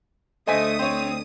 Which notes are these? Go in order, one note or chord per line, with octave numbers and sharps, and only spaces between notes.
D2 A3 C5 D#5 G#5 D#6 B6
C4 C5 C#5